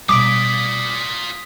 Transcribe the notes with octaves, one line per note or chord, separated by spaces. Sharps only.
B2 G3 F4 D5 D6 D#6 B6 D7